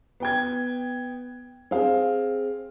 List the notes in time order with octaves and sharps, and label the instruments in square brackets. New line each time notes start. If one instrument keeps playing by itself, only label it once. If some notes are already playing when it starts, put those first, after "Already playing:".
[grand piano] B3 G5 G#6
C4 G#4 F5